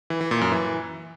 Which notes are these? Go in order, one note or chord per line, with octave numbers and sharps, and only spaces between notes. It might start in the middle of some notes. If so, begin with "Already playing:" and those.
E3
E3
A#2
F#2
E3